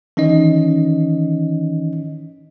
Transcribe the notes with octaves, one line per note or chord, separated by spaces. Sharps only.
D#3 E3 C#4 D#4 D#5